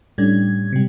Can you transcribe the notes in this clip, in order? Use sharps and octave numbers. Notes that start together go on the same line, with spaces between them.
A2 G3 C#4 D4 G#6
C3 G3